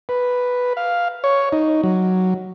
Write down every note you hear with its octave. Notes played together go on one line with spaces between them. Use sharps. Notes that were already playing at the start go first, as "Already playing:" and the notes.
B4
F5
C#5
D#4
F#3